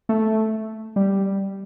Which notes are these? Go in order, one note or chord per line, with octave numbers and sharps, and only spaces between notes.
A3
G3